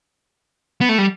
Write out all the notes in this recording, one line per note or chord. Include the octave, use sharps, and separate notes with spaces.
B3
A3
G3